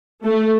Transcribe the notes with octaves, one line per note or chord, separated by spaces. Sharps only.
A3